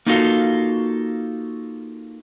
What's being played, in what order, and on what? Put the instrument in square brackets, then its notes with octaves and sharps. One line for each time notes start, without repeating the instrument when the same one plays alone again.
[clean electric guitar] A#3 D#4 F4 F#4 A4 F5